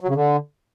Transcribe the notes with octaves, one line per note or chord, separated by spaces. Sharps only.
F#3
C#3
D3